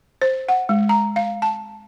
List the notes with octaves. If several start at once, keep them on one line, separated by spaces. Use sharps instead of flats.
C5
F#5
G#3
A#5
F5
A5